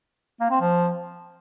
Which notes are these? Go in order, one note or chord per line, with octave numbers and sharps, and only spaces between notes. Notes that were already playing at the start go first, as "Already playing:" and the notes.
A#3
C4
F3